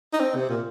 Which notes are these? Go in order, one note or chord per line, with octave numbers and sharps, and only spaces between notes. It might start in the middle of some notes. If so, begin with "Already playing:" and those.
D#4
C4
C3
A#2